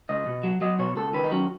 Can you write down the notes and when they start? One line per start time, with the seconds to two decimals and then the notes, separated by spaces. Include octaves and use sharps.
0.09 C#2 D#5
0.26 B2
0.43 F#3
0.61 F#3 D#5
0.79 B2 C#5
0.96 C#2 A4
1.13 D#3 B4
1.24 D#4
1.31 F#3 C#4